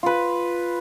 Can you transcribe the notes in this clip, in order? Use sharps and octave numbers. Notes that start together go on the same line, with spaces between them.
F4 B4